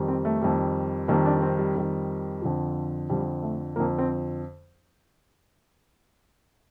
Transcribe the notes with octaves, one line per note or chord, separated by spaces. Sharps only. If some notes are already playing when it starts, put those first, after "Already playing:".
Already playing: F2 D#3 G3
C4
A3
F2 D#3 G3
F2 D#3 G3 A#3
D4
C4
G3
F2 D#3 G3
F2 D3 F3
F2 D3 F3 G3
A3
F2 D3 F3 A#3
C4